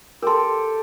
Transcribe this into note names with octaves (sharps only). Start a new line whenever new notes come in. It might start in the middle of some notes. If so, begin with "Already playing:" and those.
G4 A4 A#4 C6